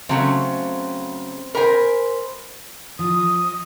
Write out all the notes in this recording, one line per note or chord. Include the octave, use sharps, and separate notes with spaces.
C#3 F#3 A3 C4
A#4 C5 G#5 B5
F3 D#6